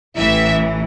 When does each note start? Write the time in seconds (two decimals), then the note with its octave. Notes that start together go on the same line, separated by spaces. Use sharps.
0.16 A1 A2 E3 E5